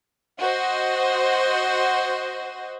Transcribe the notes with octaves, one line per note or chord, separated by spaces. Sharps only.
F#4 C5 D#5